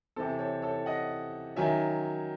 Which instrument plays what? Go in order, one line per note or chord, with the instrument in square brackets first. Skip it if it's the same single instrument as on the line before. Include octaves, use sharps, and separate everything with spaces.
[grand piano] C3 E3 C4 A4
A4 C#5
A4 C#5
D#5 F#5
D#3 F#3 C#4 E5 G#5